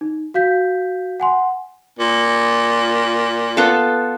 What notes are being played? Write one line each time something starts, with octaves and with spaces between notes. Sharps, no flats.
D#4
F#4 F5 G6 B6
F#5 G#5 C6
A#2
B3 F4 A4